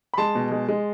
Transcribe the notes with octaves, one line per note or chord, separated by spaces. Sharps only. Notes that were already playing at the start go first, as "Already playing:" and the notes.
B5
G#3 A5 C6
B2
G#3
G#3